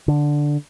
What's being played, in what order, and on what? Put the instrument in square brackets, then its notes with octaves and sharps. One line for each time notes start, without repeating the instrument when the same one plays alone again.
[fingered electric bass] D3